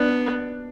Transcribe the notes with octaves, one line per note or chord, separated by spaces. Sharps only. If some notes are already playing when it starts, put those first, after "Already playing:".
Already playing: B3 D4